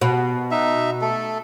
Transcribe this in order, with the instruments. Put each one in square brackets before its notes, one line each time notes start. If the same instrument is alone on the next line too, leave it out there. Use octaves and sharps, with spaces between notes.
[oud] B2
[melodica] D#4 E5
A3 A4